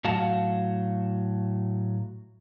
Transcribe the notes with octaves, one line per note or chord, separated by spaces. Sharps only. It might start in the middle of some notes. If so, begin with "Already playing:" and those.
A2 F#3 F#4 F5 F#5 A5